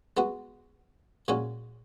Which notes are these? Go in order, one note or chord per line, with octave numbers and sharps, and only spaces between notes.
G#3 B3 F#4
A#2 G#3 C#4 F#4